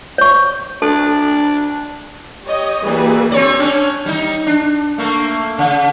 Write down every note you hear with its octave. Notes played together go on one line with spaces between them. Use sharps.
C#5 C#6
D4 A4
G4 C#5 D#5
E3 G3 A#3 F#4 G#4 B4
C4 C#5 D5
C#4 D4
G3 D#4
D4
A3 A#3
C#3